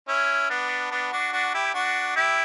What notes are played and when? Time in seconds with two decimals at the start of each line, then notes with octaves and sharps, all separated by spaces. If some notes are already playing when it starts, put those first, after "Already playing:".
0.08 C#4 E4
0.50 B3 D4
0.91 B3 D4
1.12 D4 F#4
1.33 D4 F#4
1.54 E4 G4
1.74 D4 F#4
2.16 E4 G4